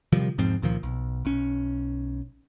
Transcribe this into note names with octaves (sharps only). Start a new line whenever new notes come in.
C3 D#3 F3 G3
E1 G#2 F3 C4
C#2 A#2 D#3 F3
B1
B1 C#4